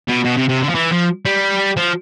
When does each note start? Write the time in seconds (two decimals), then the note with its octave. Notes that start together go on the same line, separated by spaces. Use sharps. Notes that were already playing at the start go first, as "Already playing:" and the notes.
0.08 B2
0.25 B2
0.37 C3
0.49 C3
0.63 D3
0.70 F3
0.75 E3
0.92 F3
1.26 G3
1.77 F3